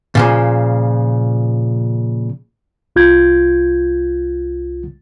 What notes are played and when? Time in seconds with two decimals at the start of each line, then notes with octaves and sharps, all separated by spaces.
0.15 A#2 C#3 F3
2.96 C2 F4 G6 G#6